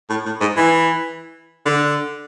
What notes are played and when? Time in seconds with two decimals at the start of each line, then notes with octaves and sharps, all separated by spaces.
0.10 A2
0.26 A2
0.40 G#2
0.56 E3
1.65 D3